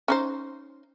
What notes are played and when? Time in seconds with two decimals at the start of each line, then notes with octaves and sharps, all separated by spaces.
0.08 C#4 D#4 C5